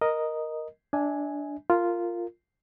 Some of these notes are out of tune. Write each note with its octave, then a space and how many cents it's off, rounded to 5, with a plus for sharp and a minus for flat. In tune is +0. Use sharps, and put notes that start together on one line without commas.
A#4 +5 D#5 +0
D4 -10 E5 -45 G#5 +0
F4 -5 A#4 -20